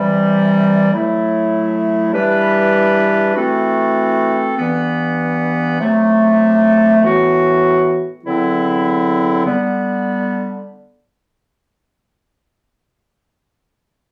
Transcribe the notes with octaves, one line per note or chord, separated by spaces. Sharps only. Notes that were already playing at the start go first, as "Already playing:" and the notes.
Already playing: C3 E3 G3
A2 F#3 A3 E4
E3 G3 D4 G4 B4
E3 A3 C4 F#4 A4
G2 E3 B3
C3 F#3 A3
A2 E3 B3 F#4
E2 D3 F#3 C4 E4
D3 G3 B3